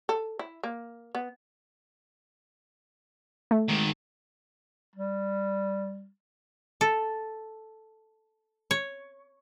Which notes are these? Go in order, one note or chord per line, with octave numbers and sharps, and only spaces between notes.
A4
E4
A#3
B3
A3
G#2 D#3
G3
A4
C#5